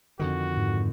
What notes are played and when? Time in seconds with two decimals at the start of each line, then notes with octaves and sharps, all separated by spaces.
0.19 F2 D3 D#3 F#4
0.57 G#2